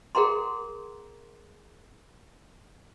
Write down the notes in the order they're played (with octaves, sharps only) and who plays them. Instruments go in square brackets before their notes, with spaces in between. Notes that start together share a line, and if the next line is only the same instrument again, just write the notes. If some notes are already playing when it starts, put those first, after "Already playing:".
[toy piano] G#4 A#4 F#5 A#5 C6